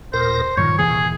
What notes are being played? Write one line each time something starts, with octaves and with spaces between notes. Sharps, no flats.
D#2 A#2 A#4 C5
G2 A#2 D#3 F3 C#5
D#1 C3 E3 A#3 G#4